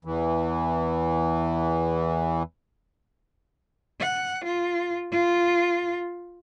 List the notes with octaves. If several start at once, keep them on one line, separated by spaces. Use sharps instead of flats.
E2 E3
F#5
F4
F4